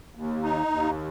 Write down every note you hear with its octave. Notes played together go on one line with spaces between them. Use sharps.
D#2
D#4
D#2